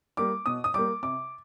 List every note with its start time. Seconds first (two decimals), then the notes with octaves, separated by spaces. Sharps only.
0.17 G3 A#3 D6
0.46 B2 D#6
0.64 D#6
0.74 G3 A#3 D6
1.03 C3 D6